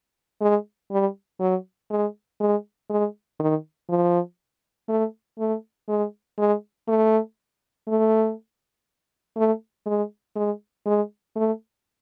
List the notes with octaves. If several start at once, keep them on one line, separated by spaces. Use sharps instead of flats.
G#3
G3
F#3
G#3
G#3
G#3
D#3
F3
A3
A3
G#3
G#3
A3
A3
A3
G#3
G#3
G#3
A3